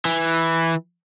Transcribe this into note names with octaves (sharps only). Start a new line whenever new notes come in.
E3